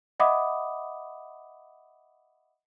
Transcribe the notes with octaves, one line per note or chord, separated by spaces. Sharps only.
D#5 E5 F#5 B5 D6 D#6